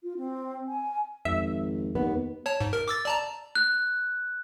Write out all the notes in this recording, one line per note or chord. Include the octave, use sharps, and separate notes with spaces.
F4
C4
G#5
G#1 F2 E5
D#2 B3
C#5 A5
G#2
A#4
D6 E6 A6
D5 A5 A#5
F#6